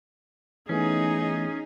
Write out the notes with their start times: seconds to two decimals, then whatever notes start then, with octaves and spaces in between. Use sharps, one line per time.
0.69 E3 A3 B3 C#4 D#4 G#4